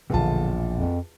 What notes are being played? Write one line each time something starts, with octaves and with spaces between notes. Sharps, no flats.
A#1 E2 B2 D3 F4 A5
F2